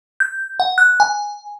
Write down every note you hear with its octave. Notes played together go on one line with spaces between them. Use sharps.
G6
F#5
F#6
G#5